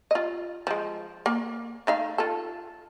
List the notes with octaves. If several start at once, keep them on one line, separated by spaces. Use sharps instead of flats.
F4 D#5
F3 G#3
A#3
A3 D#4 F5
F4 A4